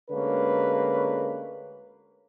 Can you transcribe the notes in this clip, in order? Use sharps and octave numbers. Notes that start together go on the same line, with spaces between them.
D2 D3 G#3 A#3 C#4 B4